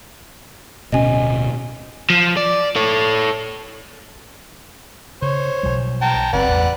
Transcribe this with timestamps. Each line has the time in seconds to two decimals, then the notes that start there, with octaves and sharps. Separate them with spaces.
0.92 D1 B2 C#4 D#5 G#5
2.10 F3
2.37 D5
2.76 A4 C#5
5.22 C#3 C5 C#5
5.63 B1 F3 G3
6.02 G5 A5 A#5
6.33 F#1 C4 B4 D5 F#5
6.48 A1 E2 A2